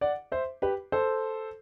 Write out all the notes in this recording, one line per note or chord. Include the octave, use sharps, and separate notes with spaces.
D5 F#5
C5 E5
G4 B4
A4 C5